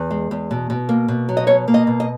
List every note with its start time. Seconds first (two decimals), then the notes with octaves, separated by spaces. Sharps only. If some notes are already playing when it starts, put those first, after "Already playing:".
Already playing: E2
0.11 G#3
0.31 E2
0.51 B2
0.70 B2
0.89 A#3
1.08 B2
1.29 F#3
1.37 D#5
1.47 B2 C#5
1.68 A#3
1.74 D#5
1.87 B2
2.00 D#5